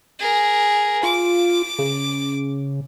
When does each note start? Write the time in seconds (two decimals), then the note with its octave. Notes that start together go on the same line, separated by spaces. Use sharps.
0.19 G#4 A#4
1.03 F4 D6
1.79 C#3